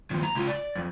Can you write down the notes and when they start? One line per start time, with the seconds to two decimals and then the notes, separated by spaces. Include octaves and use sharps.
0.11 D#2 F3
0.23 A#5
0.35 C#2 F4
0.47 D5
0.75 F2